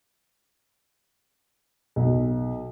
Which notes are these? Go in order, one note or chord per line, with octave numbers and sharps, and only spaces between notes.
B1